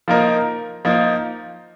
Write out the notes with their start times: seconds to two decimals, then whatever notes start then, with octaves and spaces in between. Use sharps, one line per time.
0.08 F3 A#3 D#4 A#4
0.85 F3 A#3 D#4 A#4